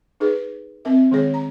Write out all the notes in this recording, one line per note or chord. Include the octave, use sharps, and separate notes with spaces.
D#4 G#4 B4
C4 A#4 E5
D#3 G#3 G#4 C#5
A#5